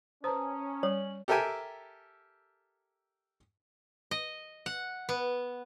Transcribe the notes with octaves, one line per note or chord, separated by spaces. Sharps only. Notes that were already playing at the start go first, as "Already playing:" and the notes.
C#4 B4 C5 A5 A#5 D#6
G3 C#5 F#7
G4 A4 A#4 E5 G5 G#5
D#5
F#5
B3